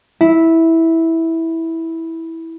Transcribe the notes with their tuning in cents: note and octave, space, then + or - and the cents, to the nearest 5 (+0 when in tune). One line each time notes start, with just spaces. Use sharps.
E4 -10